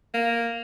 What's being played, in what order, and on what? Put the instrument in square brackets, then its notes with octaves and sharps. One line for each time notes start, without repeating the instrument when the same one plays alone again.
[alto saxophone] A#3